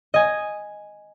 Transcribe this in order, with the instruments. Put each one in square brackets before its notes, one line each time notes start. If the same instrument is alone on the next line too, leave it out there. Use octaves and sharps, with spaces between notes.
[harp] D#5 G#5